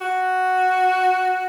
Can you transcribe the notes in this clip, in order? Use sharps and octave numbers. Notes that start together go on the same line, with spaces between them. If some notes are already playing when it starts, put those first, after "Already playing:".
F#4